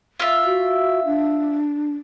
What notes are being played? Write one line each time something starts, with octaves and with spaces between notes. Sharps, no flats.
F4 E5
F#4
D4